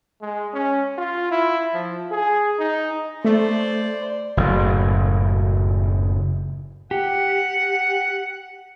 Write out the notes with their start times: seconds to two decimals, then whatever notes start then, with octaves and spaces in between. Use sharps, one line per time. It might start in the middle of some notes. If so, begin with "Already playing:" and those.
0.21 G#3
0.53 C#4
0.98 F4
1.31 E4
1.74 F3
2.11 G#4
2.59 D#4
3.25 A3 C5 D5
4.37 F#1 A2
6.91 G4 F#5